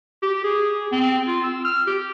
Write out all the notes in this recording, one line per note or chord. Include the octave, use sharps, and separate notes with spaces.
G4
G#4
C4
F4
E6
F6
G4